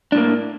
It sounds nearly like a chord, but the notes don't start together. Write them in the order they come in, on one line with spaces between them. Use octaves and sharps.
D4 A2 A#3